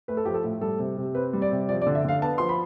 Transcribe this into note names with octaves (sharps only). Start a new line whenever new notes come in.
A3 B4
A4
F3 G4
A4
A2
G3 A4
C3
C3
C4 B4
G3
D5
C3
F3 D5
D5
D3
E5
D3 F5
B3 A5
F3 C6
B5